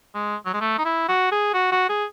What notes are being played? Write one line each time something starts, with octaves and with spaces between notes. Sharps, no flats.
G#3
F#3
G#3
A3
D#4
E4
F#4
G#4
F#4
F#4
G#4